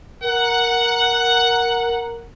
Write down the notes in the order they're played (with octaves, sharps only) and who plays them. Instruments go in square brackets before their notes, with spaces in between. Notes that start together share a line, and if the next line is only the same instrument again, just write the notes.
[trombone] A#4 [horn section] F#5